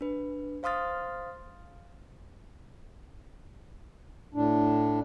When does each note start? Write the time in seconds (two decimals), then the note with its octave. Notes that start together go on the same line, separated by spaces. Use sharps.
0.01 D4 B4
0.63 C5 F5 C6 D#6 F6 A6
4.34 A2 D4